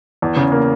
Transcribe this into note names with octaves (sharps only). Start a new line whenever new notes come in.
E2
C#3
A#3